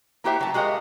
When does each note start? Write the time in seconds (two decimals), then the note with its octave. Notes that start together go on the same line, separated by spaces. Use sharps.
0.24 A#3 E4 F#4 G4 C5 E5
0.39 C#3 F#3 A3 A5
0.54 G#3 F#4 G4 A#4 D#5 F5